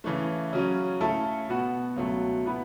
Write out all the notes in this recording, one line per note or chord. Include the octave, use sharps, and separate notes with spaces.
C#3 E3 A3
C#3 F#3 C#4
C#3 A3 E4 A4
B2 B3 F#4
C#2 B2 F#3 A3
B2 B3 E4 B4